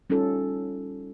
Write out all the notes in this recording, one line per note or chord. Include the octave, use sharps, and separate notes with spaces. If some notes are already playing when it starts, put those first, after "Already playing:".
G3 C#4 D#4 F4 A4